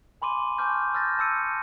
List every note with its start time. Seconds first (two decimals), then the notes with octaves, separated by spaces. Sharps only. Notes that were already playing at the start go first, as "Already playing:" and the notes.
0.22 G#5 B5 C6 D6 D#7
0.58 G#5 A5 C#6 D6 F6 G6
0.94 E6 F6 G6 A6 A#6
1.19 A5 E6 C#7 D#7